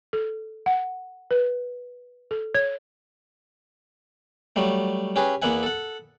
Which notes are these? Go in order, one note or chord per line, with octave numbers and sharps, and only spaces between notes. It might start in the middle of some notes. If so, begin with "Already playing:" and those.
A4
F#5
B4
A4
C#5
F#3 G3 A3
C#4 G4 G#4 B4
E2 A#3 B3 E5 F#5 G#5
A4 F#5